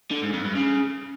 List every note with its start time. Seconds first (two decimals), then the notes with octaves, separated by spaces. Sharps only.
0.11 D3
0.22 G#2
0.33 F2
0.44 G2
0.55 C#3